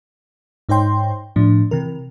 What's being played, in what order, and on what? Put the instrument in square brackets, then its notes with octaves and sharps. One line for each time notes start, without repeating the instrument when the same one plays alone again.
[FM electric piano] G#2 D#4 C5 C#5 G5 C6
A2 F3 D4
C3 E3 A#4